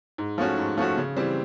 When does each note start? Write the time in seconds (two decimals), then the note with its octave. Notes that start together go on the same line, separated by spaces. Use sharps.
0.18 G#2
0.38 F3 A3 C#4 F#4
0.58 G#2
0.78 F3 A3 C#4 F#4
0.97 C#3
1.17 E3 G3 C4